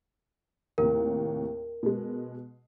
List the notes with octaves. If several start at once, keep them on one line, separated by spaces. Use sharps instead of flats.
D#2 A2 C3 A#4
B2 G#3